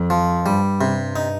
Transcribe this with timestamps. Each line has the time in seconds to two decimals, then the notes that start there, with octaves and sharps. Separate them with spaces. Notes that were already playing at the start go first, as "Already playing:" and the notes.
Already playing: F2
0.10 F3
0.46 G2 G3
0.81 C3
1.16 D#4